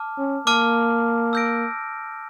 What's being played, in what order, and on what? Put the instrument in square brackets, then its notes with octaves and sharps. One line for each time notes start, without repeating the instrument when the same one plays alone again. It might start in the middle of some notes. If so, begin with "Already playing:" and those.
Already playing: [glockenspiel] A5 D6 F6
[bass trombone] C#4
[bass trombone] A#3 [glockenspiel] A5 D6 F6
[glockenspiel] E6 G6 A#6 D7